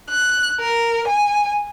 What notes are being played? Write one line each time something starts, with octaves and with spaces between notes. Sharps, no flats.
F#6
A#4
G#5